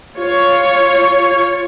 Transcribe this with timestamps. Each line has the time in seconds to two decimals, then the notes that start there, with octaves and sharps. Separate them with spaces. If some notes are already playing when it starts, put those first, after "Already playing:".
0.16 F4 C#5